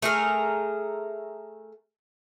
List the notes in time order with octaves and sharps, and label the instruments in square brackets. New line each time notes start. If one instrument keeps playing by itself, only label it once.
[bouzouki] A3 G#4 A#4